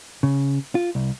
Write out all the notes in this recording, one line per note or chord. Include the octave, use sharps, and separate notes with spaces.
C#3
F4
C2